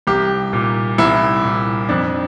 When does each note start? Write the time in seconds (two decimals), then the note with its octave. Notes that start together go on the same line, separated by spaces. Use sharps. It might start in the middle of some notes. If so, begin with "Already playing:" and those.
0.07 C2 G4
0.53 A#2
0.98 C2 E4
1.44 A#2
1.89 F2 D4